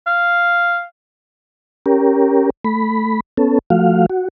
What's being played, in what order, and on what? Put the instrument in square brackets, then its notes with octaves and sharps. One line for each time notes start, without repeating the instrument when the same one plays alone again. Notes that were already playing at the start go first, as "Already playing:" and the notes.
[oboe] F5
[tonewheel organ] C#4 G4 A#4
A3 B5
B3 C#4 A4
F3 A3 F#4 F5
F#4